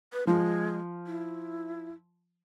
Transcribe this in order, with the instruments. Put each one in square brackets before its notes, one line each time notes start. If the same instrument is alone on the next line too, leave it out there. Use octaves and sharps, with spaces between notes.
[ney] B4
[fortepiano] F3 [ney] G#3
[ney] E4